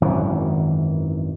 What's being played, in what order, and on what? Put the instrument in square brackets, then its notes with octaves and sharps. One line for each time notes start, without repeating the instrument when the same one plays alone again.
[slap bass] G#1 F#2 D#3 E3